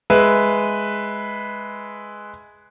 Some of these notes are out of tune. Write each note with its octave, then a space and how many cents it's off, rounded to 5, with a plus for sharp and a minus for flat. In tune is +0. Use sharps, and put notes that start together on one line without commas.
G#3 +0 B4 +0 E5 +0